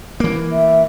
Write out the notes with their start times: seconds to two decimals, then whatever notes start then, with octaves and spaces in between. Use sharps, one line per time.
0.20 E3 A#3
0.52 E5